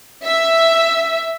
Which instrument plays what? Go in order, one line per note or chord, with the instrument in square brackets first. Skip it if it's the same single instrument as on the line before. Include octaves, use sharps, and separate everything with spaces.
[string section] E5